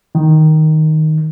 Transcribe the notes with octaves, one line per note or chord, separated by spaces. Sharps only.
D#3